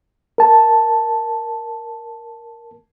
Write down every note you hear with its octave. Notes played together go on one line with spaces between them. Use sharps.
A#4 A5